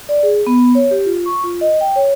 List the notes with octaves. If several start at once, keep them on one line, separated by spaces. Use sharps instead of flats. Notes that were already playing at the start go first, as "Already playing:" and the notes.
D5
G#4
B3
C#5
G4
F4
C#6
F4
D#5
G5
C#5